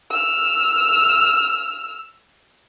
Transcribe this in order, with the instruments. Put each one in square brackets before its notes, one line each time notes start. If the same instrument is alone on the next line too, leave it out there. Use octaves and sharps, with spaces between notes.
[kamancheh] E6 F6